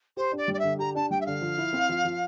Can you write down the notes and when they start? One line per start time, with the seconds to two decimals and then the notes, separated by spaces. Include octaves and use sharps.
0.17 G4 C5
0.32 D4
0.37 D5
0.48 G3
0.53 D5
0.59 D3 E5
0.79 G4 A#5
0.95 D4 A5
1.10 G3 G5
1.20 E5
1.26 D3 F5
1.41 F3
1.58 E4
1.73 C4
1.89 F3
2.05 F3